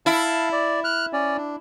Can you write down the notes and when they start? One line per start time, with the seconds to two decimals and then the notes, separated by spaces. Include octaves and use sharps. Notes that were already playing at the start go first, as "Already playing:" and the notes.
0.06 E4 F5 A5
0.52 D5
0.84 F6 F#6
1.13 C#4 D5
1.37 D4